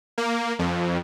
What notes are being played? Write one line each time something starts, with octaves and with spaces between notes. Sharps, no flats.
A#3
F2